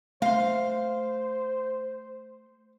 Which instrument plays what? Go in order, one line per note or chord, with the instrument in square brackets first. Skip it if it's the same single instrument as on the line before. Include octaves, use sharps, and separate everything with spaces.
[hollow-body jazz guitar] A3 C6 [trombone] C5 [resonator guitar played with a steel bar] F5